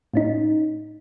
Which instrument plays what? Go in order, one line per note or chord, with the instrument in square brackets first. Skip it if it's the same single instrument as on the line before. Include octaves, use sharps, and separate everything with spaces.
[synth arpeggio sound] A2 C#4 D#4